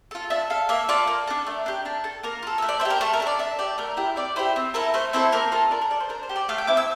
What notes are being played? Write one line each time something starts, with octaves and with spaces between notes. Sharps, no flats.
F4 A4
D4 E5
A4 F5
A#3 E5
F4 A4 D5
A#3
D4 A4
A3 A#4
D4 G4
D4
A4
A#3 A#4
F4 A4
A3 E5
D5
E4 C5
G4
A#4
A3 A4
A#4
D4 A4
D5
D4 E5
G4 D5
A3 A#4
E4 G4
C4 D5
E4 G4 C5
C4
E4 A4 A#4
A3 C5
C4 E4 A4 C5
A#3 A#4
F4 A4 A#4
D4 A#4
A#4
A4 D5
C5
D4 A#4
C5
G4
D5
A3 F5
G5
C4 E4 D6
E6